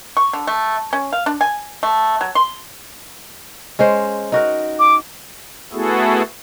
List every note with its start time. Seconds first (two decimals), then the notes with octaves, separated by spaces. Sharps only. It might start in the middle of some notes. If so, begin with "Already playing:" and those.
0.17 C#6
0.33 D3
0.47 A3
0.93 C#4
1.13 F5
1.26 D4
1.41 G#5
1.83 A3
2.21 F#3
2.35 C6
3.79 G#3 C#4 C5
4.32 D#4 F#4 A#4
4.79 D6
5.73 A3 B3 E4 F#4 G#4 A4